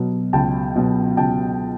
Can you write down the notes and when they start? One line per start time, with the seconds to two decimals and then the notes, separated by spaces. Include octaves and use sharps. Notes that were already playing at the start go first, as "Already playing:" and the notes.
Already playing: B2 F#3
0.33 C#2 G5 A5
0.76 B2 F#3
1.17 C#2 G5 A5